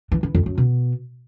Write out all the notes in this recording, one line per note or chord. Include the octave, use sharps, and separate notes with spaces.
E3
E3
F2
F#2
B2